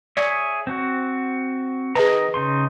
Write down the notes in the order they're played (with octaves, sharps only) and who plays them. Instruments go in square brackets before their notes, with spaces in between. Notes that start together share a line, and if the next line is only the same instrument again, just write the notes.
[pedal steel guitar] G#4 C#5 E5 [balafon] D5
[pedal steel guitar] C4 F#4
[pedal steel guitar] D#3 D#5 A#5 [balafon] G#4 B4
[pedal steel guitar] C#3 D#4 C6